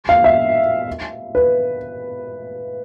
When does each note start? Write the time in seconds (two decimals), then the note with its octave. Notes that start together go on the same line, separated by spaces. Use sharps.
0.09 F5
0.24 E5
1.35 B4